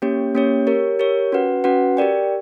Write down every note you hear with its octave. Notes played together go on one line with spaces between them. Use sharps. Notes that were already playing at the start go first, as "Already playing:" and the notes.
A#3 C#4 G4 C#5
A#3 C#4 G4 C#5
G4 A#4 C#5
G4 A#4 C#5
C#4 F#4 B4 F#5
C#4 F#4 B4 F#5
G4 A#4 D5 G5